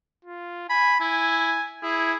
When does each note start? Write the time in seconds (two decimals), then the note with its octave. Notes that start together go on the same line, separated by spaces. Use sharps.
0.25 F4
0.69 G#5 B5
1.00 E4 G#5
1.83 E4 G#4